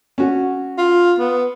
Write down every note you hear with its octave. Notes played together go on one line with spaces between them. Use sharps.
C#4 F#4
F4
B3